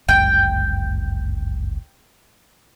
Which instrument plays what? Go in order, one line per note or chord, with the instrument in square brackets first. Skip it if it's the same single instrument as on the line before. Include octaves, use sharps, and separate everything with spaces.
[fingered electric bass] G1 C#2 F#2 [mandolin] G5